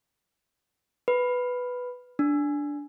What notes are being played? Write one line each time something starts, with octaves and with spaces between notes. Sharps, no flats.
B4
D4